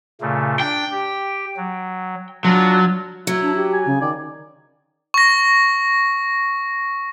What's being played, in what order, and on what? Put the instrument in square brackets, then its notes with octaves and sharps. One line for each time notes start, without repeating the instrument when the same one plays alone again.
[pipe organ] A#2 C#3 A3
[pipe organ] D4 [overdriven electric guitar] G5
[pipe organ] G4
F#3
[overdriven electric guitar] F#3 [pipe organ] D4 F4
[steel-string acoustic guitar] F#3 [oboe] E4
[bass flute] D4
G4
[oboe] G#5
[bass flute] C#3
[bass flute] D#3 [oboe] D5
[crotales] C#6 A#6